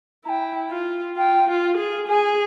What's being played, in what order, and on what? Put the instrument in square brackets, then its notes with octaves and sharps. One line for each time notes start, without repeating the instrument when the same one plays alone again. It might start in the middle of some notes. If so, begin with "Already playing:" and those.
[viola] E4 [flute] G5 A#5
[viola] F4
[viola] F4 [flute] G5
[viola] F4
G#4
[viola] G#4 [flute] G#5